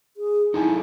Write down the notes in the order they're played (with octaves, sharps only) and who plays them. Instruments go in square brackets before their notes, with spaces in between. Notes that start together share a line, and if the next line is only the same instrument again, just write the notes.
[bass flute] G#4
[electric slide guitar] D#4 A4 G#5 [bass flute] E4